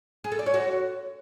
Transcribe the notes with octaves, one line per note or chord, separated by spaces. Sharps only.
G#4
A4
D5
C#5
F#4